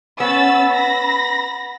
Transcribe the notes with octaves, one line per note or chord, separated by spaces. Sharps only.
B3 C#4 E6 A6
B5 A#6